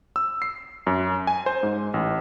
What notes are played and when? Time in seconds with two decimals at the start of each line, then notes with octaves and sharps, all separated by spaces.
0.16 E6
0.42 C7
0.87 F#2
1.27 G#5
1.46 C5
1.63 G#2
1.94 A1